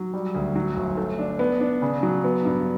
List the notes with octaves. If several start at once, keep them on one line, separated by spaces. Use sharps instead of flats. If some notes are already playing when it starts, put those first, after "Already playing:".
Already playing: F#3
G3
D2
F#3
G1
A3
D4
B3
D4
C#3
F#3
B3
G2